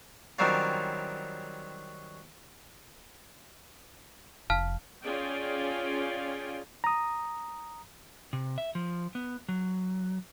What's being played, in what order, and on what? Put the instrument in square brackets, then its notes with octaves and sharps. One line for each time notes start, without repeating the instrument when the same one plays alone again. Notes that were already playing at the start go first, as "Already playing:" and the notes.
[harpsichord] D#3 F#3 G3 C4 C#4 F4
[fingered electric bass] F1 [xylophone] F5 A5 F6
[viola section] C#4 F4 G#4 D5 G5
[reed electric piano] A#5 D#6
[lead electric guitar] C3
E5
F3
B3
F#3